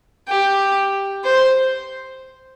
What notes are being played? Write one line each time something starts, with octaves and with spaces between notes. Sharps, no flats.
G4
C5